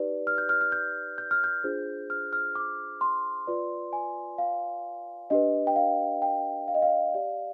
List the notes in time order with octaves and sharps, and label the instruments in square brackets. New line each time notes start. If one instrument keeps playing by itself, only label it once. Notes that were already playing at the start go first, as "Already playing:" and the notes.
Already playing: [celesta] D#4 G4 B4 D5
F6
G6
F6
F6
G6
G6
F6
G6
D4 F4 G#4 C5
F6
F6
D6
C6
F4 B4 D5
G#5
F5
D4 G4 B4 D#5
G5
F5
G5
F5
D#5
F5
G4 D5